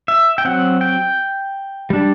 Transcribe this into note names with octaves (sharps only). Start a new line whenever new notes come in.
E5
G5
F#3 C4 F#5
G5
G3 D4